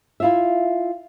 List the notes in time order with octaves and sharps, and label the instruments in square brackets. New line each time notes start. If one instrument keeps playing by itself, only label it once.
[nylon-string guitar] E4 F4 E5